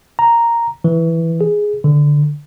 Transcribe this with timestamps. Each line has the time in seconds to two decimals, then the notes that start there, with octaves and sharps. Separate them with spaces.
0.19 A#5
0.84 E3
1.41 G#4
1.84 D3